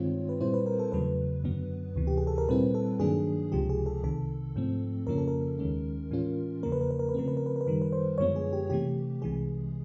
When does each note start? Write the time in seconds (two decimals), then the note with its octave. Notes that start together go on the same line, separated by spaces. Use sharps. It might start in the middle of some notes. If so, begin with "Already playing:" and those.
Already playing: G2 D#3 G#3 C4 F4 C#5
0.29 B4
0.40 A#2 G3 C4 E4 C5
0.54 B4
0.66 A#4
0.79 A4
0.92 E2 C#3 F#3 A3 B4
1.44 F#2 D3 F#3 B3
1.96 D2 C3 E3
2.07 G4
2.17 G#4
2.27 A4
2.38 A#4
2.49 A#2 G3 C4 E4 B4
2.75 A4
2.99 G2 D#3 F#3 A#3 D4 G#4
3.52 C#2 C3 F3 G#3 G4
3.70 G#4
3.86 A4
4.04 C2 C3 D#3 A4
4.56 G#2 F3 A3 C4
5.07 F2 C#3 F3 A#3 C#4 A#4
5.18 A4
5.28 A#4
5.59 D#2 D#3 G#3 C#4
6.11 A2 E3 G#3 C#4 F4
6.63 E2 C#3 F3 A#3 A#4
6.72 B4
6.81 A#4
6.91 B4
6.99 A#4
7.09 B4
7.14 C#3 F3 A3 C4 A#4
7.28 B4
7.37 A#4
7.46 B4
7.56 A#4
7.61 B4
7.66 F#2 D#3 G3 A#4
7.82 B4
7.92 C5
8.18 F#2 D3 F3 G#3 B3 C#5
8.36 G#4
8.53 G4
8.70 C3 E3 A3 G4
9.22 C2 C3 E3 G#3 G#4